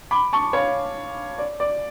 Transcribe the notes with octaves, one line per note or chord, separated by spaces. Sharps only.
B5 D6
A5 C#6
C#5 F5
D5
D5